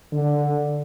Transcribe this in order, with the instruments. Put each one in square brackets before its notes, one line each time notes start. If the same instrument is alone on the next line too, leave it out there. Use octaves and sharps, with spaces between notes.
[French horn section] D3